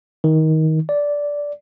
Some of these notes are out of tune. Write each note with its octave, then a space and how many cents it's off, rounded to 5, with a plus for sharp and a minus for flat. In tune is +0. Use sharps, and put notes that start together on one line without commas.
D#3 +20
D5 -10